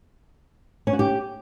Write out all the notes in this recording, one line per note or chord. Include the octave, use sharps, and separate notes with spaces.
C#4
F#4
G4